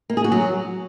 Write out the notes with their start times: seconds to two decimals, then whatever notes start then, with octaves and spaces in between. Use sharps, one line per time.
0.10 A#3
0.17 G#4
0.24 F#4
0.32 F#3